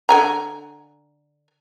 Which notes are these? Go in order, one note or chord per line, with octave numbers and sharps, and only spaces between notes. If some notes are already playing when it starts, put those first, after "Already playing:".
D3 G#5 A#5